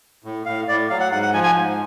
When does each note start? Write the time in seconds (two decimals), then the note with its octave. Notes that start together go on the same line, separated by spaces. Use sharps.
0.24 A2
0.46 A2 F5
0.68 A2 D5
0.90 F#3 F5
1.00 F#5
1.11 G#2 F#5
1.22 F#5
1.33 F3 G#5
1.44 G#5
1.55 G#2